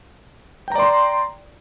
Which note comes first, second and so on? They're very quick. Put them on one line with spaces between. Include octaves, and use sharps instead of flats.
G5 A#5 D5 C6